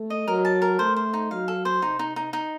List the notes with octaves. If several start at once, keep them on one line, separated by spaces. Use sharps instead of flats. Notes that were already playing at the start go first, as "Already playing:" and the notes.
Already playing: A3
D#5
F#3 A#4
A5
A#4
A3 C5
C5
D#4
F#3 F5
A4
C5
C3 D#4
D#4
D#4
D#4